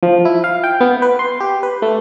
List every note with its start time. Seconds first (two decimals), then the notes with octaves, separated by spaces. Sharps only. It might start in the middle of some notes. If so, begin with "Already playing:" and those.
0.03 F3
0.25 E4
0.44 F5
0.64 G5
0.81 B3
1.02 B4
1.19 C6
1.40 G4
1.63 B4
1.82 A3